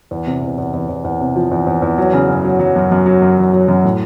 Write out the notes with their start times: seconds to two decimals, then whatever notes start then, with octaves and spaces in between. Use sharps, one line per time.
0.11 E2
0.27 C3
0.42 E2
0.58 E2
0.73 E2
0.89 E2
1.04 E2
1.21 C3
1.36 F3
1.51 E2
1.67 E2
1.82 E2
1.98 F#3
2.13 C#3
2.29 F#2
2.45 F#3
2.60 F#3
2.76 F#2
2.92 F#2
3.06 F#3
3.22 F#2
3.38 F#3
3.53 F#3
3.68 F#2
3.84 A2